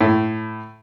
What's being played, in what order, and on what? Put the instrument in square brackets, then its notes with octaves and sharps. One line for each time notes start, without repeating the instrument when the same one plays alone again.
[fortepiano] A2